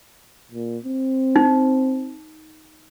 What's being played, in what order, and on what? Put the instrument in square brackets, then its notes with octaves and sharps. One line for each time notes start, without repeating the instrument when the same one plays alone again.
[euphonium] A#2
C4
[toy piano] D#4